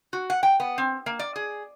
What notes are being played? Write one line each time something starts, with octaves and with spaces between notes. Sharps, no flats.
F#4
F#5
G5
B3
C4
A#3
D5
G#4